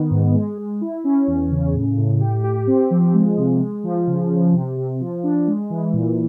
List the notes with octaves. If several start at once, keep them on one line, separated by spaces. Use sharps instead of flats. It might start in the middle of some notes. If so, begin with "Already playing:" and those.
Already playing: D#3 B3
G#2
G#3
G#3
E4
C#4
E2
C#3
A2
A2
G4
G4
C4
F3
G#3
C3
G#3
F3
C#3
C#3
C3
C3
F3
D4
G#3
E3
A#2